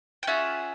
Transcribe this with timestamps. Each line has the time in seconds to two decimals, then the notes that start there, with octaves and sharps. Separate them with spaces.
0.23 G5
0.27 C#4 F4 G#4 E5 F#5